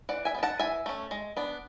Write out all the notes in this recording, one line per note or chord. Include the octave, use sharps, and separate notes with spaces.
E3 D5 F#5
E5 G#5
B3
D4
F#5 A5
E3 E5 G#5
A3 C#4
G#3
B3 D4